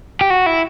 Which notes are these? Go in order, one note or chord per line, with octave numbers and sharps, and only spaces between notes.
G4
F#4
E4